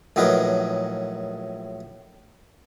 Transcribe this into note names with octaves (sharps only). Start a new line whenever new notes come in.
A#1 A2 F#3 D#4 A#4 B4